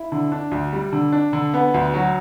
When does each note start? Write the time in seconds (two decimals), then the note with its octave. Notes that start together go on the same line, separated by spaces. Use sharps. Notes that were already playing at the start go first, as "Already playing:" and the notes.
Already playing: E4
0.12 D3
0.32 D4
0.51 D2
0.73 G3
0.92 D3
1.12 D4
1.33 D3
1.54 B3
1.74 D2
1.94 F#3